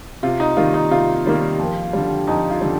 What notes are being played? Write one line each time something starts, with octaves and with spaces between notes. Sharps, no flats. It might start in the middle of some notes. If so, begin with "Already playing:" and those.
C3 F4
D#4
D#3 G3 A#3 F4
D#4
C3 F4
D#3 G3 A#3
F2
D3 G3
F2 D#4
F4
D3 G3